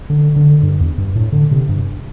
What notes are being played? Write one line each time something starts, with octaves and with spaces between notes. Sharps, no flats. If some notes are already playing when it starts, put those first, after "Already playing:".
D3
D3
G2
E2
G2
A2
D3
C3
G2